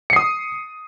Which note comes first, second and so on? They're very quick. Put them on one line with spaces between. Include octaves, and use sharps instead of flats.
C#7 C7 D#6